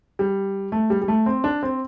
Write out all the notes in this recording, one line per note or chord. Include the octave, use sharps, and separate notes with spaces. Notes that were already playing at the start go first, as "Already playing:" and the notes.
G3
A3
G3
G3
A3
C4
D4
C4